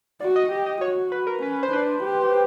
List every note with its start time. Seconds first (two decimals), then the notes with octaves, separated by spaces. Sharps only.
0.20 F#4 D5
0.36 D#5
0.51 G4 D#5
0.66 D#5
0.81 F#4 C#5
1.12 B4
1.27 A#4
1.42 C#4 B4
1.52 B4
1.63 C5
1.72 D4 B4
2.03 G4